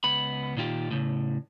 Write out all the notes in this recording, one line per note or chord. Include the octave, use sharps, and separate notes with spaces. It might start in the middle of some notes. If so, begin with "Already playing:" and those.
C#2 B3 B5
A#2 D#3 F4 G4
A2 C#3